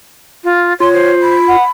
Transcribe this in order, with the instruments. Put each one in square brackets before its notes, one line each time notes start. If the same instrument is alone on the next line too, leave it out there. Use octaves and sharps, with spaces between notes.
[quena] F4
[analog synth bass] F4 [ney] C#5 [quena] C6
[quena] C5
[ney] B5
[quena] F#5